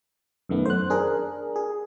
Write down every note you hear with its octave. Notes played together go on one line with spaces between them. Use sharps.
F#2 D#3 A3 B3
C5 F#6
D4 G#4 A#4
G#4